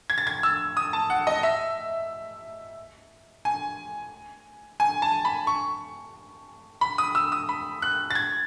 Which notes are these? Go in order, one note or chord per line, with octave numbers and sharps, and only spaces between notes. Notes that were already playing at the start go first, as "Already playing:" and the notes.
G#6
A6
G#6
E6
D#6
A5
F#5
D#5
E5
G#5
G#5
A5
B5
C#6
B5
D#6
E6
D#6
B5
F#6
A6
G#6